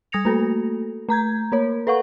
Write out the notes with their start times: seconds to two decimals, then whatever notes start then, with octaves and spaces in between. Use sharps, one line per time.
0.12 G3 D#6 G#6 A#6 C#7 F7
0.25 A3 A#3 F#4 A4
1.09 A3 A#5 G6 G#6
1.52 A#3 A#4 C#5
1.87 A4 B4 F5 F#5 C#6